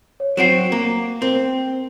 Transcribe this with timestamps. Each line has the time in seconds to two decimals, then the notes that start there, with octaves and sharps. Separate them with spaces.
0.20 C#5
0.37 F#3 C4 F#4 C7 D7 E7
0.72 A#3
1.22 C4 A#4